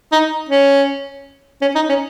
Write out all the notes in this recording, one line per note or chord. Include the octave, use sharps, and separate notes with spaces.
D#4
C#4
C#4
D#4
C#4